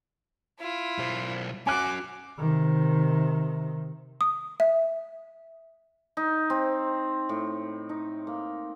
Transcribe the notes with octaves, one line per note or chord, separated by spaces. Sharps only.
E4 F4
B1 C5
C#4 F#4 G#5 D6 F#6
C3 D#3
D#6
E5
D#4
C4
A2
D#4
A#3